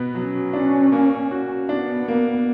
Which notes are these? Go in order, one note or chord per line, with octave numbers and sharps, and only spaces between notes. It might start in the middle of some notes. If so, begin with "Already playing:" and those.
Already playing: B2 B3
F#3 C#4
D4
A#3
F#4
B3 D4
A#3